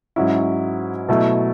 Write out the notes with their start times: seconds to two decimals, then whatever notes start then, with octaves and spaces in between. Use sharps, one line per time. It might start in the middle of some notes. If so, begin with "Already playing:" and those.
0.16 G#2 F#3 C#4 E4
1.09 B2 F#3 A3 E4